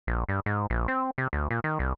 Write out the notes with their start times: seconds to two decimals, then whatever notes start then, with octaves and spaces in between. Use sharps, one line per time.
0.07 A#1
0.29 G2
0.46 G#2
0.70 A#1
0.88 C4
1.18 C3
1.33 D2
1.51 A#2
1.64 D#3
1.79 C2